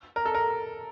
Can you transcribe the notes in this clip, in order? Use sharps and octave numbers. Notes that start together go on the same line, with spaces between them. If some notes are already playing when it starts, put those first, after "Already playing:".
A#4
A4
A#4